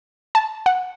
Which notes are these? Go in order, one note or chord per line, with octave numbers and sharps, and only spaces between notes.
A5
F#5